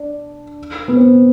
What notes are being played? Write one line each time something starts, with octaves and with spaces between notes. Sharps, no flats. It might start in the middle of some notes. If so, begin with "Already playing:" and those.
Already playing: D4
B3
C4